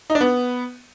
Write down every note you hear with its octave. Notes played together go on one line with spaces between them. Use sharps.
D#4
D4
B3